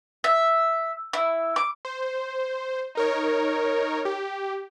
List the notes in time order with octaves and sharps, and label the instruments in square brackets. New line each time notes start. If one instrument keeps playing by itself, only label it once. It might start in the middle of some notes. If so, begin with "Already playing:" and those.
[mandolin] E5
E4
D6
[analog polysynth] C5
D#4 A#4 C#5
G4